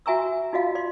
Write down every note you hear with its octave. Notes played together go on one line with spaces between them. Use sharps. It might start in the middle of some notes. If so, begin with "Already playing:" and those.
F#4 E5 G#5 A#5 C#6 E6
D#4 F4 F#4 D#5 F5
D5 C6